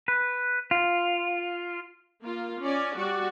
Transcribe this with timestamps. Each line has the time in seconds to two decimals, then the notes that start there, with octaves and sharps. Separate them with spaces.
0.08 B4
0.71 F4
2.22 A#3 F4
2.61 C#4 D5
2.96 G3 F#4 D5